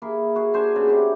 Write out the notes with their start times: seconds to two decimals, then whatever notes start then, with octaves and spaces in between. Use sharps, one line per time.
0.02 A#3 E4 G#4
0.36 F#4 G#4
0.53 D4 G#4 C5 G#5
0.76 C#3 B3
0.88 C4 D4 E4 G4